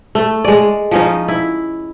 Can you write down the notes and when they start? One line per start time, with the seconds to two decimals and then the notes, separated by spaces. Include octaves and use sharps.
0.15 A3
0.44 G#3 D5
0.91 F3 C#4 D#4
1.28 E4